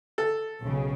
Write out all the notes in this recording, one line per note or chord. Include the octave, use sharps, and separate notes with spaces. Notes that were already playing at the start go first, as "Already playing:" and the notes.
A4
B1 C#3